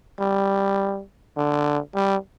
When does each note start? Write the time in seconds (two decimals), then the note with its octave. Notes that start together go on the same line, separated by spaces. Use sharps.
0.19 G3
1.37 D3
1.95 G3